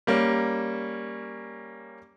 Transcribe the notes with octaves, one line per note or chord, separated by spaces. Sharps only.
G3 A#3 C#4